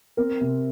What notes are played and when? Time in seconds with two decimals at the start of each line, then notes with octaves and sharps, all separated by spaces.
0.17 C4 A#4
0.41 C3